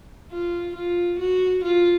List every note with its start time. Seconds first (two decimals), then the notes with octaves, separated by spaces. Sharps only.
0.32 F4
0.76 F4
1.20 F#4
1.65 F4